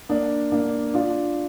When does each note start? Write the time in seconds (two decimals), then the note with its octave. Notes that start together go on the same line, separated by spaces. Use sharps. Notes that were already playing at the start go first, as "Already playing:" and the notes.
0.09 A#3 D4
0.52 A#3 D4
0.94 D4 F4